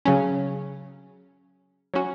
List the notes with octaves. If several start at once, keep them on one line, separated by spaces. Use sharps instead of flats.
C#3 F#3 C#4
F#3 C#4 F#4